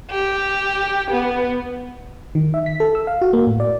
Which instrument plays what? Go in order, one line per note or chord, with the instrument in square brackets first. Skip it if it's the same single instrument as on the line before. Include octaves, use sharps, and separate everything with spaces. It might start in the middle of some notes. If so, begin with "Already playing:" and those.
[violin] G4
B3
[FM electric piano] D#3
E5
B6
A4
E6
F5
F#4
A#3
A2
D5